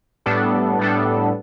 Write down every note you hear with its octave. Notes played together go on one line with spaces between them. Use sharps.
A2 G3 B3 D4 A4
A2 G3 B3 D4 A4